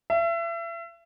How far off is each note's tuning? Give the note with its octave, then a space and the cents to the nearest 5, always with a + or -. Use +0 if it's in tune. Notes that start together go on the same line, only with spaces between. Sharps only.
E5 +35